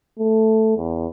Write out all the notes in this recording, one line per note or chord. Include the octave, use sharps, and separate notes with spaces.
A3
E2